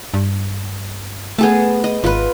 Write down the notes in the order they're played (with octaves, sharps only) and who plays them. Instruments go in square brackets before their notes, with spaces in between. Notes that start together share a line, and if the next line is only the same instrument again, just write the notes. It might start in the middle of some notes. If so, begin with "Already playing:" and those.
[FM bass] G2
[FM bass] A3 [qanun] B3 G#4 A5
[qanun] D#5
[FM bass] G#1 [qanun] F4 B4